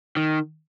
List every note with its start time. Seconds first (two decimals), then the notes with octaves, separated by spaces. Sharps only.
0.17 D#3